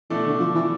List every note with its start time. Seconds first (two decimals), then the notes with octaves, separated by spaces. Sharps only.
0.10 B2 E3 A3 D4 A4 D5
0.26 D3
0.40 F3
0.55 E3